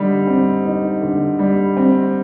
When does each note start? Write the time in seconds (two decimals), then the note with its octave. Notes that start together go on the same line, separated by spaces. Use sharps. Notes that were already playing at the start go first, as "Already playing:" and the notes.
Already playing: D3 G3 D#4
0.27 C4
0.65 D#4
1.01 D3
1.39 G3
1.77 C4